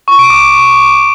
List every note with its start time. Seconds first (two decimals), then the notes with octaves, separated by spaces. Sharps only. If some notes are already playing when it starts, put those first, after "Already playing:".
0.08 C#6
0.19 D7
0.30 D6